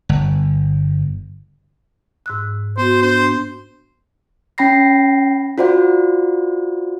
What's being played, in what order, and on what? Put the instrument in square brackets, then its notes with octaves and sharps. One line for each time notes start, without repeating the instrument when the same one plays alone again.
[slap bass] G1
[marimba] G#2 E6 F#6
[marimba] B3 F#4 [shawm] C5
[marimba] D4 [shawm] C5
[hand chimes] C#4 G5 B5 A#6 C7
F4 F#4 C5 D5 F#5